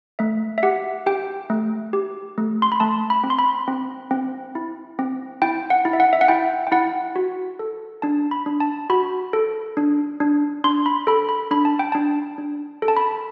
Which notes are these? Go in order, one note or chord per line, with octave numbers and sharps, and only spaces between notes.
A3 E5
E5
G4 F#5
G4 G5
A3
G4
A3
C6
B5
A3 A5
B5
C4
C6
B5
C4
C4
E4
C4
E4 G5
F#5
E4
E5
F#5
E5
F#5
E4 G5
G5
E4 F#5
F#4
A4
D4 A5
B5
D4
A5
F#4 B5
A4
D4
D4
D4 C6
B5
A4 B5
B5
D4 B5
A5
G5
D4 A5
D4
A4
A5
B5